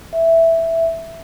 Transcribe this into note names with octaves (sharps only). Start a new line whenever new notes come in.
E5